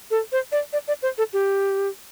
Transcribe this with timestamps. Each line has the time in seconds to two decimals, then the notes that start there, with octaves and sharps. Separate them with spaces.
0.11 A4
0.32 C5
0.52 D5
0.73 D5
0.88 D5
1.03 C5
1.18 A4
1.33 G4